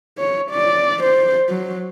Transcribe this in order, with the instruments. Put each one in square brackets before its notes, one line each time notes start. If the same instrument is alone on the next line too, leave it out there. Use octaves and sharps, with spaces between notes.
[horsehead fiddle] C#5
D5
C5
F#3